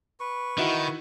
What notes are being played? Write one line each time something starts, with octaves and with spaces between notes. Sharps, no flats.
B4 C#6
D#3 D#4 E4 F#4